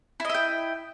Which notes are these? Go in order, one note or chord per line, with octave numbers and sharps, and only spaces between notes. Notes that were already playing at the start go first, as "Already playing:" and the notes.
E4 D#5 E5 G5